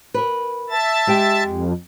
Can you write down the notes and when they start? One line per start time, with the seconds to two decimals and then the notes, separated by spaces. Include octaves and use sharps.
0.14 A#4 B4
0.70 E5 A5 A6
1.07 G#3 G4 G5
1.44 F2